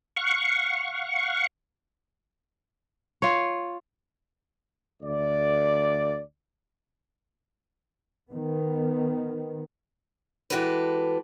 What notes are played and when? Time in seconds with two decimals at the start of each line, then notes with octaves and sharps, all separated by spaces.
0.16 F5 F#5 C#6
3.22 F4 C#5
5.02 D2 D5
8.30 D#3 B3
10.50 E3 G#3 F#4 G4 A4 B4